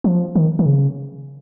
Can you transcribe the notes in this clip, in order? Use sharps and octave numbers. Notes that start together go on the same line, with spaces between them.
F3
D#3
D#3
C#3